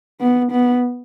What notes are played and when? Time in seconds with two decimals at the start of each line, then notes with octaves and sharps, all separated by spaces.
0.21 B3
0.52 B3